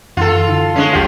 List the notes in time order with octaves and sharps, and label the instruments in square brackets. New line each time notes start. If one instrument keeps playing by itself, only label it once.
[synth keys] F#2 E3 E4 [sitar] F4 A4
[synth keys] D3 D#4
[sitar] G#3 C#4 [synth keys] D4 D#7
[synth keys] G#1 D#2 G3 [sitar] F4 G4